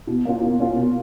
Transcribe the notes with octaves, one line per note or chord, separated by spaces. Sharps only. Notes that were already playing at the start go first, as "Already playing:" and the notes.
B2
A#3 C#4 F4
B2
A#3 C#4 F4
B2